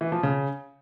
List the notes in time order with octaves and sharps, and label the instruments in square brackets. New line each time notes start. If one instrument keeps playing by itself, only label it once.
[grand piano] E3
F3
C#3